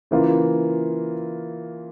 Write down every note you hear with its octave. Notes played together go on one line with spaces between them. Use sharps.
C#3 E3 A#3 F4